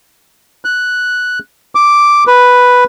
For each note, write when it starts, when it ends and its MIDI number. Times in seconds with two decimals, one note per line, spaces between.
0.65 1.39 90
1.75 2.24 86
2.27 2.84 71